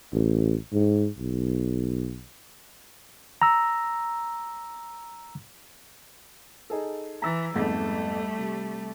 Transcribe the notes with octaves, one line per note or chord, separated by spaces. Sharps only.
A1
G#2
B1
A#5 E6
D#4 G#4 A4
E3 A#5 E6 A6
F2 G#2 G3 A3 B3
C3